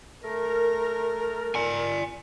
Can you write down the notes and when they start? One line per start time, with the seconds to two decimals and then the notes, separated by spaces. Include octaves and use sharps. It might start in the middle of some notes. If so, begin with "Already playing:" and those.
0.23 A3 A#4
1.55 D5 G#5